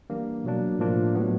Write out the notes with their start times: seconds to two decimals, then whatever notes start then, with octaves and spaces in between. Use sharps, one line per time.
0.10 E3 G3 A#3 D4
0.44 B2 F#3 A#3 D4
0.79 A2 F3 A#3 D4 F4
1.15 A2 F#3 B3